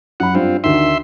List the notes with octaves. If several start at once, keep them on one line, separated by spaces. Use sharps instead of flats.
F#2 F#5 B5
G2 C4 F4
D2 D#3 E5 C6